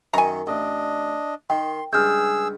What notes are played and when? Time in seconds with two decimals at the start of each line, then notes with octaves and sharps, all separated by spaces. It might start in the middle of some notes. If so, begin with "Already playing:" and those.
0.13 F#2 D#3 C#4 G#5 A#5
0.47 A1 D4 D#5
1.50 D#3 G5 C6
1.93 C#2 G2 G#4 E6 F6 G6